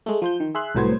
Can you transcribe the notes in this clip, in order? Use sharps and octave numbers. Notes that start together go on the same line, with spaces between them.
G#3 A3
F3 C5 G6
D#3
G#4 E5 C6 F#6
C2 A2 F#3 B3 C5 G#6